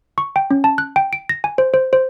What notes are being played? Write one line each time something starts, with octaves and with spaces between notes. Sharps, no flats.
C#6
G5
C#4
A5
F#6
G5
D7
A#6
G#5
C5
C5
C5